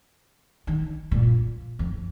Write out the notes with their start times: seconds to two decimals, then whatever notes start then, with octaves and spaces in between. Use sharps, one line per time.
0.67 D#3
1.11 A#2
1.79 F2